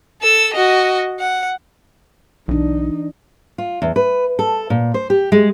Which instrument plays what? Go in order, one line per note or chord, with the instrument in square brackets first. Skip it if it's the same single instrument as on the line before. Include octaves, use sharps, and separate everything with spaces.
[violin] A4 E6
F#4 D#5
F#5
[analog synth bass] B1 [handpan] E3 D4 [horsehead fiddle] D#4
[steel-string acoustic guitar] F4
E2
B4
A4
A#2
C5
G4
G#3